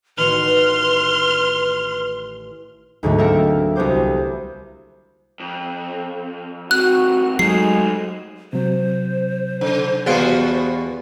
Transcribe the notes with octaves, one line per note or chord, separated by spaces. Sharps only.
A1 D#3 F#4 B4 C6 F6
D2 G#2 D3 F#3 A3
A#3 C4 A4 A#4 E5
C2 B3 F#4 C5 D6
F2
F#2 C3 F#4 F#6
F#3 G#3 A3 D#4 G#4 C7
C3 F#3 C5
C#3
E2 B2 G3 F4 F#4